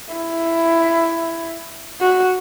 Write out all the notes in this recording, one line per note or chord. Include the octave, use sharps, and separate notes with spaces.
E4
F#4